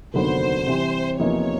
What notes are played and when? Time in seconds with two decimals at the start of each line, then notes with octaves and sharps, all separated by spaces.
0.14 F1 D#2 D3 F#3 B3 C5
0.67 C3 E3 G3
1.19 E2 C3 F3 A#3 D#4 C#5